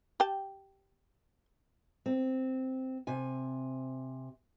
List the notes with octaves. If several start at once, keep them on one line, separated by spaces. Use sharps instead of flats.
G4 G5 A5
C4
C3 G#5